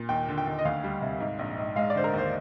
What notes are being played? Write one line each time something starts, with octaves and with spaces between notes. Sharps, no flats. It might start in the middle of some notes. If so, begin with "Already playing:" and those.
Already playing: A#2
D#2 G5
D3
G5
D#2
D#5
D2 F5
G3
C3
G#2
A#1
G#2
G#3 F5
D5
D3 C5
A#4
D#2 C5